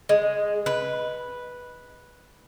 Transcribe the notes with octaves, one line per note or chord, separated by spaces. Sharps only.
G#3
B4